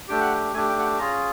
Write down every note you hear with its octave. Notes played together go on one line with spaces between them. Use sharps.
A3 D4 G4 G5
F#5
G5
A3 D4 G4 G#5
G5
F#5
G5
C#4 F4 G#4 A#5